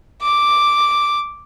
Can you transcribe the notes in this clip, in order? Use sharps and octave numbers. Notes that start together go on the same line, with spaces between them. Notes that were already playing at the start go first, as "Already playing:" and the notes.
D6